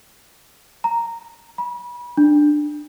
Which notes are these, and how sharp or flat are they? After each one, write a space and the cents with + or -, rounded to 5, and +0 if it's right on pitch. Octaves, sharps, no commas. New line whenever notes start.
A#5 -5
B5 -30
D4 +15